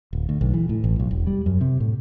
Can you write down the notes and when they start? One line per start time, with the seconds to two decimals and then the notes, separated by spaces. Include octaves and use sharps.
0.13 D1
0.29 D2
0.41 B1
0.54 E3
0.69 A2
0.84 A1
0.99 B1
1.11 E1
1.27 G3
1.46 F#2
1.61 C3
1.80 A2